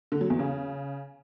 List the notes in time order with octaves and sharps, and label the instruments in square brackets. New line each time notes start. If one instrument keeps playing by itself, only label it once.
[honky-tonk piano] D3
F#3
E2
C#3